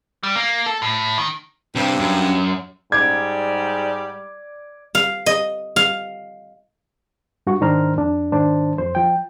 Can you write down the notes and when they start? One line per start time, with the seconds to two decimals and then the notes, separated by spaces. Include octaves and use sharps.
0.23 G3
0.36 A#3
0.66 A4
0.82 A2
1.18 D#3
1.75 G2 C3
1.99 F#2
2.92 G#2 G3 D5 G#6
4.95 F5
5.26 D#5
5.76 F5
7.47 G2 F#4 F#5 C#6
7.61 G#2 D#3 D4 C5 A#5 F6
7.97 F2 D4
8.32 G#2 D#3 D4 C5 A5
8.78 F2 C5
8.95 F3 G5